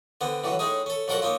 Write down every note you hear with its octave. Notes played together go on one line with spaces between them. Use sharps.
D3 B3 C4
A2 D3 E3 F#3
A2 G#3 C#4 D#4 G#4
C#4 A4
F2 F#3 A4 A#4 F#5 A5
A#3 C#4 D#4 F4